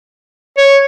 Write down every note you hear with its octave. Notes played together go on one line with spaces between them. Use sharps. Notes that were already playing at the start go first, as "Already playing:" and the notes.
C#5